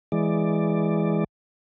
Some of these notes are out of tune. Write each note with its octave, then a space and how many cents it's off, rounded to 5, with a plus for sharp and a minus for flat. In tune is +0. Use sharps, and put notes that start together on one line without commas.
E3 +0 G#3 +0 D5 +5